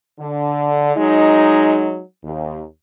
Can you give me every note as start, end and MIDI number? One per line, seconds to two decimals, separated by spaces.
0.19 0.95 50
0.96 2.00 54
0.96 2.00 56
0.96 2.00 63
2.23 2.62 39